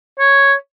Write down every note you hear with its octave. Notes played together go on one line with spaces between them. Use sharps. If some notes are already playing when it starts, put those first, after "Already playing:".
C#5